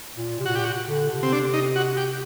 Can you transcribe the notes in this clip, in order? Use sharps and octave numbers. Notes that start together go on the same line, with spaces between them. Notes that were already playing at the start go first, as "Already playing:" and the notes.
A#2
C3
A#2 F#4
G4
F#4
D3
C3
C4
D4
D#4
F#4
G4